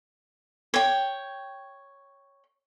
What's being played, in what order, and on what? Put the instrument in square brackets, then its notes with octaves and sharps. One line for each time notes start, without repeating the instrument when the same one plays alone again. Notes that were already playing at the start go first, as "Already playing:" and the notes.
[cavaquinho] C#5 G5